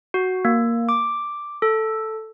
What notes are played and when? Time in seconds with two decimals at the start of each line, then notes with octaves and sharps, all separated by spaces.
0.14 F#4
0.45 A#3
0.89 D6
1.62 A4